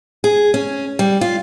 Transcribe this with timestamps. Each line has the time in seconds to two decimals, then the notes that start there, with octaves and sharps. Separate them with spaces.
0.24 G#4
0.54 C#4
0.99 G3
1.21 F4